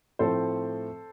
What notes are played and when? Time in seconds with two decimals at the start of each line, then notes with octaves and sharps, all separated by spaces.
0.19 A2 F3 A3 C4 A4 C5